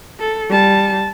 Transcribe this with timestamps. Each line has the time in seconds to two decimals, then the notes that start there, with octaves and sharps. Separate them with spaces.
0.20 A4
0.49 G3 A5